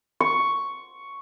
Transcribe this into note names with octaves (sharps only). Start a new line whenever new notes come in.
C#6